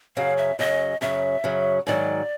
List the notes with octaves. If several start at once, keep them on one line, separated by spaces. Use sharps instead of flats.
F#2 C#3 F#3 F5
E5
F#2 C#3 F#3 D#5
F#2 C#3 F#3 E5
F#2 C#3 F#3
G#2 D#3 F#3 D5